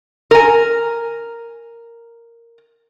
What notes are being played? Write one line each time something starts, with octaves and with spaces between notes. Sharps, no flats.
A#4 G#5